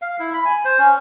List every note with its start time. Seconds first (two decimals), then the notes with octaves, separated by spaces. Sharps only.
0.02 F5
0.19 E4
0.34 B5
0.45 G#5
0.65 C5
0.78 C#4